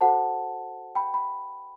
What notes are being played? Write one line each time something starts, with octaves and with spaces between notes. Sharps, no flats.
F#4 A4 C5 F#5 A5
G5 B5
B5